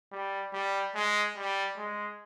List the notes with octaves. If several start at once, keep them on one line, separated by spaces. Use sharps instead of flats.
G3
G3
G#3
G3
G#3